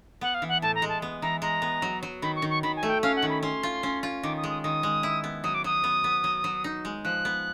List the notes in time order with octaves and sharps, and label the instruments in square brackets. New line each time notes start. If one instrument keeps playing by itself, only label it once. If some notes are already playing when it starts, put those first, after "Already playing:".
[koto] B3 [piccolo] F#5
[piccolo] F5
[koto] E3
[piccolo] F#5
[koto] A2 [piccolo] A5
[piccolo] A#5
[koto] G#3
[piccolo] A5
[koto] B3
[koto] E3 [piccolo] A#5
[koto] G#3 [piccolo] A#5
[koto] B3
F#3
F#3
[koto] D#3 [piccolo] B5
[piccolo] C#6
[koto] D#3
[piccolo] C#6
[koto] D#3 [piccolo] B5
[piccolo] G#5
[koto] A3
[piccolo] G5
[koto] C#4 [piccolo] F5
[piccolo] F#5
[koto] D#3
[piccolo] B5
[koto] C#4 [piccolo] C6
[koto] F4
C#4
F4
[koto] D#3 [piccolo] D6
[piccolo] D#6
[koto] G#3
[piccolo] D#6
[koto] D#3 [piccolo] D#6
[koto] G#3
E4
B3
[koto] F#3 [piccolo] D#6
[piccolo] D6
[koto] F#3 [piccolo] D#6
[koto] B3
B3
F#3
F#3
D#4
G#3
[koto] F3 [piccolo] F#6
[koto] B3